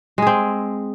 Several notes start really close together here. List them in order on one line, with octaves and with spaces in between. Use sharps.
G#3 G#4 C4